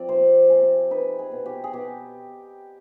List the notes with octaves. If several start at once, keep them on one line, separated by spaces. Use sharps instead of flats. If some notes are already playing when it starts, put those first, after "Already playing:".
Already playing: F3 C4 D5
C3 C5
C3 G#4
D#4 B4
G#4
B2
G4
G#4
B2 G4